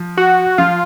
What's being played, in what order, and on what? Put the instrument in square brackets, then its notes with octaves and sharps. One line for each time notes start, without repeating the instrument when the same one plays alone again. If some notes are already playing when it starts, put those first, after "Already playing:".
Already playing: [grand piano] F3
[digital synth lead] F#4
[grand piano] F3 [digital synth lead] F4